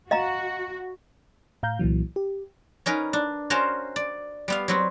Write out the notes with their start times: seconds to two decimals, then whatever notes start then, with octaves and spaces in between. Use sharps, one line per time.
0.11 F#4 D#5 F5 A#5
1.63 A2 F5 A#5 G6
1.79 C2 A#2 E3 F#3
2.16 G4
2.86 C#4 D#4 A#4 B4
3.13 D4
3.50 C#4 F#4 A#4 C5 F5 A5
3.96 D5
4.48 G3 B3 F5
4.68 F#3 C4 F#4